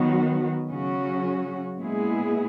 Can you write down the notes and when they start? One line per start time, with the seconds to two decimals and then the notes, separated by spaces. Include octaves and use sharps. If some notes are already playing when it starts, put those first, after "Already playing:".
Already playing: D#3 F#3 B3 F#4
0.69 C#3 F#3 C#4 F#4
1.78 A#2 G#3 B3 E4 G#4